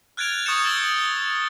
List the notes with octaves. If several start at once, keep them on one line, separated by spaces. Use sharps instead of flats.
F6 F#6 G#6 A6 D7 F7
C#6 D#6 G6 A6 C#7 E7
E6 A6 G7